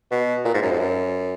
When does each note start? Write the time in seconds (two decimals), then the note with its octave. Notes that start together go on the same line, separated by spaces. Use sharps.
0.11 B2
0.45 A#2
0.54 G#2
0.62 F#2
0.71 F2
0.80 F#2